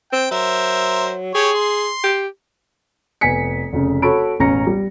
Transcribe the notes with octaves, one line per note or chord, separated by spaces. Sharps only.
C4 G5
F#3 A#4 C5 E5
G4 G#4 C#5
C6
G4
F1 B3 G#5 B6 C#7
F1 C#3
F#4 A4 C#5 B5 D7
E1 A1 C#4 A#5 A#6 C#7
G3